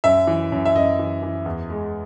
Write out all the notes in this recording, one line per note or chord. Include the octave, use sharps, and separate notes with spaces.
F#2 E5
E3
F#2
E5
F#2 D#5
E3
E3
E2
G#3